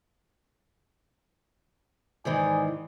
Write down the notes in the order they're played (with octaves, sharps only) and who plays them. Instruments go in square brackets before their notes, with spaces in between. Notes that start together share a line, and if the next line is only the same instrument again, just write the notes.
[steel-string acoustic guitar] G#2 D#3 E3 [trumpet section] D5 D#5 G#5